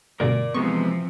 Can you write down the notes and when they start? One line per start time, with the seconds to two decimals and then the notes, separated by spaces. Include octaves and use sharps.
0.20 D2 G2 B2 A#4 D5
0.54 C3 E3 F3 G#3 B3 C#6